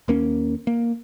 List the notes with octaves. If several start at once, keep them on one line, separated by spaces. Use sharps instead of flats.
D#2 A#3 C#4
A#3